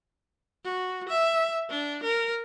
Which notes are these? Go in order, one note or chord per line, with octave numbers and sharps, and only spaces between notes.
F#4
E5
D4
A#4